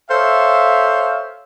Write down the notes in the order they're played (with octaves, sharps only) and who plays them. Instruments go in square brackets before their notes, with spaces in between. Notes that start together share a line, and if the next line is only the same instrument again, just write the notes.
[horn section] A4 C5 C#5 E5 F5